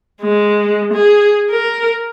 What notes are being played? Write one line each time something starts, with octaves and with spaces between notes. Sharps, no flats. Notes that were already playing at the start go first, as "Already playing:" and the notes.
G#3
G#4
A#4